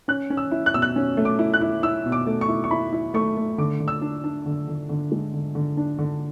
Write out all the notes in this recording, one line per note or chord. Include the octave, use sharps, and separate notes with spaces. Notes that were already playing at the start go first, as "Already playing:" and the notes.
C#4 F#6
C#4
E6
E4
F#6
B2 E6
F#6
C#4
A3
D6
E4
F#6
E4
E4 E6
B2
D6
A3
C#6
E4
C#6
E4 B5
E4
A3 C#6
A3
D3 D6
D3
E6
D4
D4
D3
D3
D3
G#3
D3
D3
D4
D3